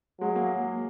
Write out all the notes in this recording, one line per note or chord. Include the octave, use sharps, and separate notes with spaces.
F#3 G#3
A#3